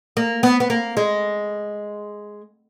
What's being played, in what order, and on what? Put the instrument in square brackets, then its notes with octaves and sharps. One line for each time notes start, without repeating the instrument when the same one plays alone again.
[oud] A#3
B3
B3
A#3
G#3